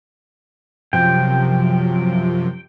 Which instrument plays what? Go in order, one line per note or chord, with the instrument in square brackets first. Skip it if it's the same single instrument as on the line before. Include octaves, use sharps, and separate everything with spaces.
[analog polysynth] F#2 C3 F3 [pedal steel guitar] G5